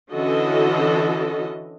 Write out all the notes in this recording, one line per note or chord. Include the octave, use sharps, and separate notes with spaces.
D3 E3 C#4 F#4 A4 D#5